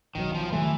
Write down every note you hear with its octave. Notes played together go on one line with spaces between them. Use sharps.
B1 B2 D#3 F#3
F3
D#3 E3 F#3 A3